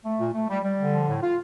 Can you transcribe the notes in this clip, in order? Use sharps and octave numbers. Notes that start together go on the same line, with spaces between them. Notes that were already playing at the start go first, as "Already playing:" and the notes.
A3
A#2
A3
G3
G3
D3
F3
A2
F4